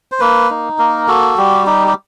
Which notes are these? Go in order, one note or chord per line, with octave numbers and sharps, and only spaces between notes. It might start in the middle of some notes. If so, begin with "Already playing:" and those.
C5
A#3 B4
D#4
A#3 A#4
F#4 A4
G3 G4
D#4 G4
G4